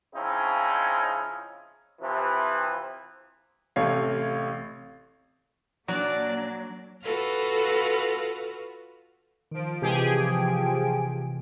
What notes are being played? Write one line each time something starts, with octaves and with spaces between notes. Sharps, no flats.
C#3 F3 C4 C#4 D#4 E4
C3 E3 F3
A1 C3 A3 C#5 F5
A#2 F#3 A#3 D4 D5
F4 F#4 A4 B4 F6
D#3 F3 D7
C3 E3 G#3 G4 G#4 G#5